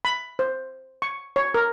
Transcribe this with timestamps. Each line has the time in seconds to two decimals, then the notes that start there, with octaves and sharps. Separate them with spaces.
0.05 B5
0.39 C5
1.02 C#6
1.36 C#5
1.54 A#4